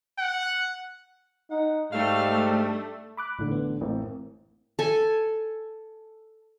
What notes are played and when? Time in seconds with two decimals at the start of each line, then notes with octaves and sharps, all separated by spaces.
0.19 F#5
1.51 D#4 F#5
1.92 G#2 G3 A3 F5
2.52 D4
3.17 B5 D6 F#6
3.39 A1 A2 D3
3.51 B3
3.81 A1 A#3 C4
4.79 A4 G#5